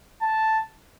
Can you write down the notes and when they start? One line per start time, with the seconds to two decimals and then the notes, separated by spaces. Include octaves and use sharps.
0.22 A5